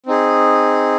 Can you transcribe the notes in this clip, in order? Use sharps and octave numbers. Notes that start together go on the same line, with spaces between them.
C4 D#4 G#4